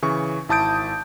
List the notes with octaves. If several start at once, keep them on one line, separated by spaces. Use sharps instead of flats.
C#3 E3 C#6
G#1 E4 A5 D#6 G6 D7